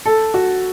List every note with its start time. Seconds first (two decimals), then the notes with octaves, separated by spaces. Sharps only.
0.06 A4
0.34 F#4